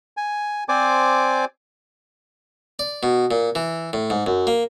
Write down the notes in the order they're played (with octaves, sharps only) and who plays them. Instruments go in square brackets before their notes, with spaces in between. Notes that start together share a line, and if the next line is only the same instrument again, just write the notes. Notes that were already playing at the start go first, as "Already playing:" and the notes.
[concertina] G#5
C4 C5 D5 G#5 D6
[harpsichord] D5
B2
A#2
E3
A2
G#2
F#2
A#3